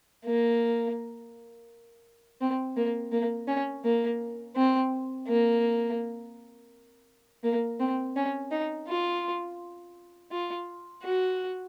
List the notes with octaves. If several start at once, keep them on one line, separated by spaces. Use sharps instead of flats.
A#3
C4
A#3
A#3
C#4
A#3
C4
A#3
A#3
C4
C#4
D#4
F4
F4
F#4